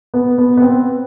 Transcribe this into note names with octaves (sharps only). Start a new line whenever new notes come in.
B3
B3
B3
C4